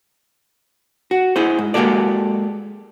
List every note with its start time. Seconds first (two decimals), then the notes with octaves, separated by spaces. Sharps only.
1.11 F#4
1.36 E4 G#4 C5
1.59 G#2
1.74 G#3 A#3 F#4 G4 A4 D5